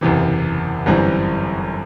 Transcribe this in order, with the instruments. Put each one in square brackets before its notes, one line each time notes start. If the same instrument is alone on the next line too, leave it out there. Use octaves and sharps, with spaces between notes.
[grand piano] F#1 E2 C3 E3
G1 F#2 E3 G3 C4